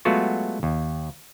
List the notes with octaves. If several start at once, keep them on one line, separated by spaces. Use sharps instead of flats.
F#3 G#3 A3 B3 F4 F#4
D#2